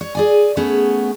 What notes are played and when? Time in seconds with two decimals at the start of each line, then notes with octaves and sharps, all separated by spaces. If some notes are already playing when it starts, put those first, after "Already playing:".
0.01 C#5
0.15 G#4 D5 G#5
0.57 A3 B3 C#4 G#4